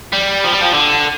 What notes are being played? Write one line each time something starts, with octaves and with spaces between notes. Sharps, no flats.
G3
F3
G3
F3
D3